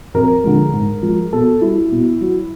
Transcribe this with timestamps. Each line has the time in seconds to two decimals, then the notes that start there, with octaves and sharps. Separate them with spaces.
0.14 F2 A#4
0.44 D3 F3 G#3
0.73 G#2
1.02 F3 G#3
1.32 B2 A4
1.61 G3 E4
1.91 B2
2.21 F#3